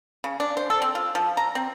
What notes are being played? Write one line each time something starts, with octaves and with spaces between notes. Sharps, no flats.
C#3
D4
C5
A4
C4
F4
F3
A#5
C4